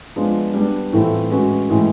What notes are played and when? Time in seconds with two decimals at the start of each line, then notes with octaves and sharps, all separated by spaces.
0.16 F3 G#3 B3 D4 F4
0.54 G3 B3 D4
0.93 A2 E3 A3 C4 F4
1.31 G#3 C#4 F#4 B4
1.70 A2 E3 G#3